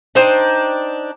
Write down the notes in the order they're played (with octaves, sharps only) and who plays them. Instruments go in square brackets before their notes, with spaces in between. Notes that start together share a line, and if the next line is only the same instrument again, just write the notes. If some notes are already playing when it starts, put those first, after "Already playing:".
[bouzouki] D4 D#4 C5 G5